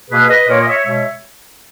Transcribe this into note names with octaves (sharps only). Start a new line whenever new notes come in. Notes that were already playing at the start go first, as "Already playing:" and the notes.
B2 A#3 G#4 B4
B4 D#5
A#2 A#3 A#4 C#5
D#5
C#5 E5
B2 G#3 C#5 E5